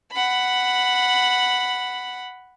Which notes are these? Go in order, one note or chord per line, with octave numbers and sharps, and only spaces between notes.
F#5 B5